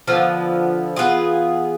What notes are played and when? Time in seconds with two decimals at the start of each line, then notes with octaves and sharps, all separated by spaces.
0.07 D3 F3 B3
0.96 E3 B3 F4 G#4